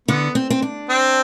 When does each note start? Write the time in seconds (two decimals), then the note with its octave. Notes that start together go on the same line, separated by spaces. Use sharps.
0.08 D3 B3
0.35 C4
0.50 C4
0.62 D4
0.89 C4